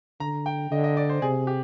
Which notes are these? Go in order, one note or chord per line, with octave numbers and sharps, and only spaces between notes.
D3 A#5
G5
D3 D#5
D#5
D5
C5
C3 G#4
G4